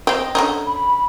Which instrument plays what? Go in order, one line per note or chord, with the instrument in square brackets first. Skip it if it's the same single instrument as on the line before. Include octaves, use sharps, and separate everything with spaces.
[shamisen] C4 G4 [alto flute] D#5
[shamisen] D3 C#4 D#4
[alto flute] B5